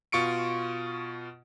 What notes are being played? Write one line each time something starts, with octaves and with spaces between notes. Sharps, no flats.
B2 F4 C#6 C#7 D7